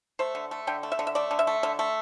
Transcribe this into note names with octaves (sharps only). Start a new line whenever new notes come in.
A3 C5
D3
A3
D3 G5
A3
E5
D3
E5
A3 D5
D3
E5
A3
D3 E5
A3